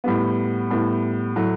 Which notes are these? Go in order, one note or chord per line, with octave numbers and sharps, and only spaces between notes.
A2 G3 B3
A2 G3 B3
A2 F#3 A3